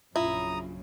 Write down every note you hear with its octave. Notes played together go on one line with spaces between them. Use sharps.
A#1 F#2 C#3 E4 F4 A#5 D#6